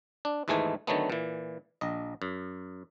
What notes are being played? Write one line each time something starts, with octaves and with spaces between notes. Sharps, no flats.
D4
D#2 G#2 E3 G#3 A3 G#5
D3 D#3 F#3 A3 B3
A#2 E3
A#1 D#5
F#2